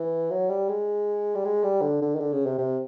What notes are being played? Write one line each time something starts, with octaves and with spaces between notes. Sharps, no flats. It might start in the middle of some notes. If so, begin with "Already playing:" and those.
Already playing: E3
F#3
G3
G#3
G3
G#3
G3
D3
D3
D#3
D3
C#3
C3
C3